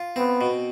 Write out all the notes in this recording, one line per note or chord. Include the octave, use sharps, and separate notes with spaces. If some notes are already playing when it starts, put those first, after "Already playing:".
Already playing: F4
B3 C4
B2